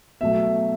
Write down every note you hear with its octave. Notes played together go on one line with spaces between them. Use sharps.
B2 F#3 A3 E5